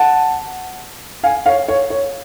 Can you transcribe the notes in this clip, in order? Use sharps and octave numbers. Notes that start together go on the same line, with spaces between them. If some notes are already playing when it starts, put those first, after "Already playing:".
Already playing: F#5 A5
F5 G#5
C#5 F5
C#5
C#5